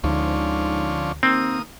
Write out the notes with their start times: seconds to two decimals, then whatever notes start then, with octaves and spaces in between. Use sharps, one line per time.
0.04 D2 G#2 D3 F3 C#4
1.23 D#2 A#3 C4 D#6